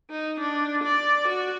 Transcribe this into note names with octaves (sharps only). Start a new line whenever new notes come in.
D#4
D4
D5
F#4